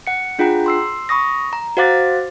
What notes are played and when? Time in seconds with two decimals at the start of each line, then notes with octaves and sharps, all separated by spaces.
0.07 F#5 C#7
0.39 D4 F4 G#4 F#5 G5 A#5
0.66 C6 E6 C7
1.09 B5 C#6 D#6 A#6
1.53 A#5
1.77 F#4 C5 F5 F#5 D6 A6